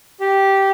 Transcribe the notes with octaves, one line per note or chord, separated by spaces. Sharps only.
G4